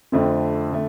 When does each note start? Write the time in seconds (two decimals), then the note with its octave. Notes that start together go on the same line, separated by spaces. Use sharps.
0.12 F2 D3 A3 C4
0.72 D3 A3